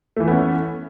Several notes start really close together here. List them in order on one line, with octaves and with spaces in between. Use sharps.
A3 E3 E4 B3 C#4